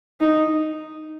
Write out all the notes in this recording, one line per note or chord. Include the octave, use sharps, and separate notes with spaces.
D#4